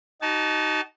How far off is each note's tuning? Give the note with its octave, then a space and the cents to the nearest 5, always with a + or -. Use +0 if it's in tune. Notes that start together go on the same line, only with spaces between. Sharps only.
D#4 +0 F#4 +40 A5 -20